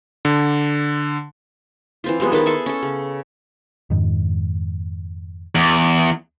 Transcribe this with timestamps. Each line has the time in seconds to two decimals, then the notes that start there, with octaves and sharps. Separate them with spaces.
0.25 D3
2.04 E3 C4 F4
2.20 F3 G3 G#3 B3
2.32 D#3 G#3 B4 A5
2.46 G#4 A4 B4 E5
2.66 C#4 A4
2.83 C#3
3.90 F2 G#2 D#3
5.55 E2